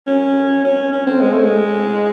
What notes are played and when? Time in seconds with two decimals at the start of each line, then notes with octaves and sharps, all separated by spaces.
0.07 C#4
0.64 C#4
0.92 C#4
1.07 C4
1.20 G#3
1.33 A3
1.44 G#3